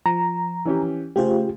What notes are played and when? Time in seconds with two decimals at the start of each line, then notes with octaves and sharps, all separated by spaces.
0.06 F3 A#5
0.65 E3 C#4 G4
1.16 C#3 A3 F4 G4 G#4 C5